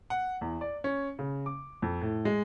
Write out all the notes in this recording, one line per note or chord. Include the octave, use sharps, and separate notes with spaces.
F#5
E2
D5
C#4
C#3
D6
F2
A2
G#3